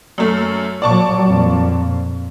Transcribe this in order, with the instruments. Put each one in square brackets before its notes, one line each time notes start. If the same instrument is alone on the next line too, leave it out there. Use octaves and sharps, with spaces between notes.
[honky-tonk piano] F#2 A3
[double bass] A#2 F#3 [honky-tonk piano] D5 A5 C#6
[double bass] F2 A#2